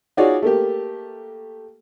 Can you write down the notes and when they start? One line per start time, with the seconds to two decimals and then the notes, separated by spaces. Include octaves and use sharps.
0.17 D#4 F4 F#4 G#4 C#5 D5
0.42 A3 A#3 G4